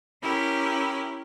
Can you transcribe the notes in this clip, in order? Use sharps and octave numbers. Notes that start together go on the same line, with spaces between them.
C#4 E4 G4 A#4